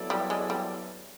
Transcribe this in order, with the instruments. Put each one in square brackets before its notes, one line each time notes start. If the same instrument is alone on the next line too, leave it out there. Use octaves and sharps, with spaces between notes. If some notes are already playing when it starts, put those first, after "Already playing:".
Already playing: [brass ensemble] F#3 B3 E4 A4 D5
[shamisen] G3
G#3
G3